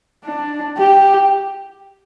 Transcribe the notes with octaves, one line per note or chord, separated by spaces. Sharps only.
D4
G4